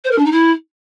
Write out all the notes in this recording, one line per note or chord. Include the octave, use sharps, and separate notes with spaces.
C5
A#4
D4
D#4
E4